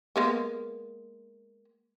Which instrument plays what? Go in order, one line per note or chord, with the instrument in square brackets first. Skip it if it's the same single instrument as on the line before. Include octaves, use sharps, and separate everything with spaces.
[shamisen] G#3 A#3 B3